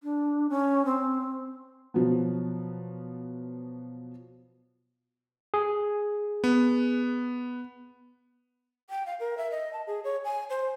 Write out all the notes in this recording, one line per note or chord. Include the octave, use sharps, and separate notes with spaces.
D4
C#4
C4
B2 F3 F#3 B3
G#4
B3
G5
F5
A#4
E5
D#5
A5
G#4
C#5
G#5
C5